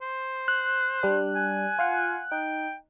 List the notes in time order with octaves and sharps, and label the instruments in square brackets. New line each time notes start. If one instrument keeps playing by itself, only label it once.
[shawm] C5
[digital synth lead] F#6
[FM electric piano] G3 D4
[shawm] G#5
[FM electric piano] F4 F5 F#5
[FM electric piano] D#4 [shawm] G5